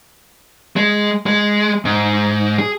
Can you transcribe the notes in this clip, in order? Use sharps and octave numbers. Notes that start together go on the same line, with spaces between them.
G#3
G#3
G#2
G#4